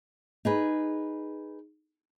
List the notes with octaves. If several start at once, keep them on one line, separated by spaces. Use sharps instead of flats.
D#4 G#4 B4